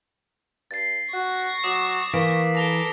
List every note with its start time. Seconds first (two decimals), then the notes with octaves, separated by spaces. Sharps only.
0.71 G2 A6 C7
1.13 F#4 C#6 A#6
1.64 F#3 D6 D#6 E7
2.13 E3 A#3 B6 D7
2.55 A4 A#4 A#6 F7 G7